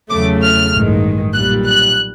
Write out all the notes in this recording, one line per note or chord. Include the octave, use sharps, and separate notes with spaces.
E2 C#3 F#3 A3 D6
F6
A1 G2 D#3 G#3
B1 A#2 G3 F#6
F#6